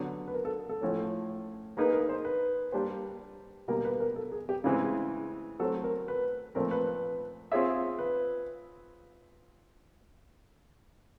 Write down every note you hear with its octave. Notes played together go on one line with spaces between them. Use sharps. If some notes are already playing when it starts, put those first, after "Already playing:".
Already playing: D3 F#3 B3
B4
A#4
A4
A4
A2 F3 A3 C#4
A#3 D#4 G#4 A#4 B4
A#4
C5
B4
G3 A#3 D4 G4 C5
B2 G3 A#3 A#4
A#4
B4
A#4
A4
G#4
G4
C#3 E3 G#3 C4 G#4
F#3 A3 C4 A4
A#4
B4
A#2 F3 A3 C4 A#4
B4
B4
C4 F4 G#4 C#5 E5
B4